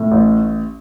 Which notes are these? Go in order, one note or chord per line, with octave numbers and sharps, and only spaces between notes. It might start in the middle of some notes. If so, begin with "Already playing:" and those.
Already playing: A2
A1